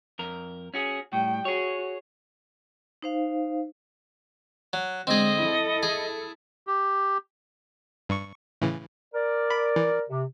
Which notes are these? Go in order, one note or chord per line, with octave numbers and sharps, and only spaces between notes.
F2 A#4
C#4 F#4 G#4
A2 G3 G5
F#4 G#4 C#5
D#4 C5 F5
F#3
D3 G#3 C4 G#4 D#5
E4 A4
G#4
G4
G2 C#6
A2 C#3 E3
A#4 D5
B5
E3
C3